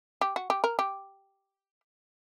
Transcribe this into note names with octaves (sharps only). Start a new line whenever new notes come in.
G4
F#4
G4
A#4
G4